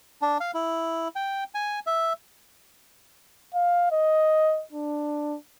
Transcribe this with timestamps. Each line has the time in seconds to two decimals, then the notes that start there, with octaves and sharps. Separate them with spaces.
0.22 D4
0.40 F5
0.54 E4
1.16 G5
1.54 G#5
1.86 E5
3.54 F5
3.92 D#5
4.73 D4